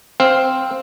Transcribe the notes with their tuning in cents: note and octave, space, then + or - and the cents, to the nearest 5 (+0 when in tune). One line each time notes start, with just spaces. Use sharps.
C4 +0 F5 +0